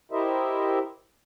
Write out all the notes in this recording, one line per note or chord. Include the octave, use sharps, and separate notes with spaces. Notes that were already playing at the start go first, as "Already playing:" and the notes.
E4 G4 A#4 C5 D#5 E5